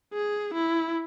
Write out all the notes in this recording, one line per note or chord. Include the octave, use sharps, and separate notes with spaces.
G#4
E4